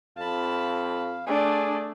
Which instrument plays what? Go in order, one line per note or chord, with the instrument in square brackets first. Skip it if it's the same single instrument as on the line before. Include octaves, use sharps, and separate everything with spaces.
[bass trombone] F2 [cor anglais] F5 [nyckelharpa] A5 B5
[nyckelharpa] A3 D5 [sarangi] D4 [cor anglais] G#4